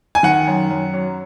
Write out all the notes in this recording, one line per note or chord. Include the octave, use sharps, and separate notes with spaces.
G#5
D#3 F#5
F#2
F#2
F#3